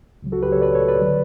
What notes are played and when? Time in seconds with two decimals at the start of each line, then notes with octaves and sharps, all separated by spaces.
0.22 C#2 C#3 F#3
0.32 F#4 A4
0.42 G4 B4
0.52 A4 C#5
0.62 B4 D5
0.75 A4 C#5
0.88 B4 D5
1.01 D3 F#3